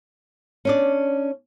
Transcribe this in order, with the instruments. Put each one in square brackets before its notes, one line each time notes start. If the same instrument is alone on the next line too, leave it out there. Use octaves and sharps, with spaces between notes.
[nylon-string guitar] C#4 D4 D5